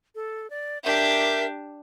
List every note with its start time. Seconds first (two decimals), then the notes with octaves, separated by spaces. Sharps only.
0.15 A4
0.51 D5
0.84 D4 G4 A#4 E5 G6